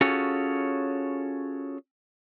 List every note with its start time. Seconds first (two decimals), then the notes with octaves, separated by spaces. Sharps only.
0.01 C#4 F4 F#4 G#4 A4 C#5